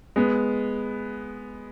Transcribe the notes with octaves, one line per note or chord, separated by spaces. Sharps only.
G#3 B3